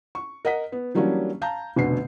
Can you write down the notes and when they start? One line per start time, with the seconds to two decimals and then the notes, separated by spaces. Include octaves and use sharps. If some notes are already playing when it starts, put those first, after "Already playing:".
0.15 C#6
0.45 A#4 D#5 F#5 B6
0.72 B3
0.94 E3 F#3 G3 A#3 C#4 D4
1.42 F5 A5 A#5 G6
1.76 F1 B2 D3 B3 C7